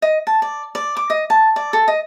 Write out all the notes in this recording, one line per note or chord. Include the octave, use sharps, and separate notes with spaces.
D#5
A5
D5
D5
D6
D#5
A5
D5
A4
D#5